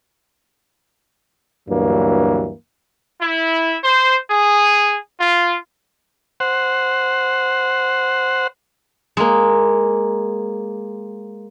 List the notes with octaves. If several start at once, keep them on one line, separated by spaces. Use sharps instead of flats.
D2 G2 E3 F#3 A#3
E4
C5
G#4
F4
C5 F#5
G#3 A#3